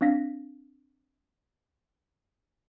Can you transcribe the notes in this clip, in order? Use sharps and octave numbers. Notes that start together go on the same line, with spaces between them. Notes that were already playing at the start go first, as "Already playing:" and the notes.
C4 D4 F5 A#6 B6